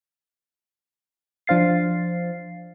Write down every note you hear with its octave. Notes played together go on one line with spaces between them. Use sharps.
F3 D4 C5 F5 A6 C7